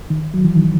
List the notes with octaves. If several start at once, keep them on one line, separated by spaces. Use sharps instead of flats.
D#3
F#3
E3
D#3